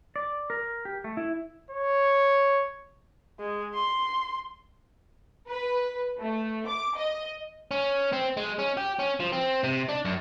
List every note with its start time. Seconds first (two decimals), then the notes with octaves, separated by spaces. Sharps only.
0.16 D5
0.50 A#4
0.85 G4
1.04 A3
1.17 E4
1.71 C#5
3.39 G#3
3.75 C6
5.50 B4
6.20 A3
6.66 D6
6.96 D#5
7.71 C#4
8.13 C4
8.37 G#3
8.59 C#4
8.77 G4
8.99 C#4
9.20 F3
9.32 C4
9.64 C3
9.89 D4
10.05 F#2